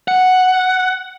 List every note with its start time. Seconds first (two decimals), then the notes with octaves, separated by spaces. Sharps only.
0.08 F#5